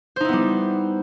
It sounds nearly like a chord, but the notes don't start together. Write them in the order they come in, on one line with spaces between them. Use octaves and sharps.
C5 D#4 E4 B3 G3